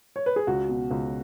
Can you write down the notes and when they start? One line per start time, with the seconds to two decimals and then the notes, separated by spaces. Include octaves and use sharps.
0.16 C#5
0.26 B4
0.36 G#4
0.47 C#2 F#4
0.69 B2
0.91 C#2